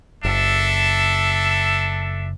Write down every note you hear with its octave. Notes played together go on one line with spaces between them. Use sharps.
F#1 D4 A4 E5